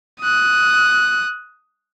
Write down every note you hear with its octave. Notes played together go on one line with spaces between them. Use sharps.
D#6 F#6